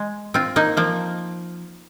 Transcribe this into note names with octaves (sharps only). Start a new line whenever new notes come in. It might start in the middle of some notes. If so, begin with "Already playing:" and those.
Already playing: G#3
C4 F4
A#3 D#4
F3 A#3